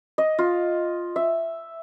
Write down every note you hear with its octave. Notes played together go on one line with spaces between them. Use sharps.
D#5
F4
E5